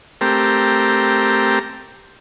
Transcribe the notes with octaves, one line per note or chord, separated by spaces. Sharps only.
A3 C4 G4 A#4